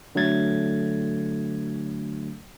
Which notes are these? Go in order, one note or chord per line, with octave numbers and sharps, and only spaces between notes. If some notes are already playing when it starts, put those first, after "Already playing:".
D3 F#3 A3 G#6 A6